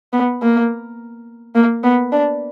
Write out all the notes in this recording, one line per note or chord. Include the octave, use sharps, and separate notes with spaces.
B3
A#3
A#3
B3
D4